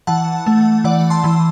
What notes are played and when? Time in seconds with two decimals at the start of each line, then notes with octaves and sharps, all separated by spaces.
0.07 E3 F#5 A5
0.47 A3
0.84 E3 D5 F#5
1.10 A5 C6
1.24 E3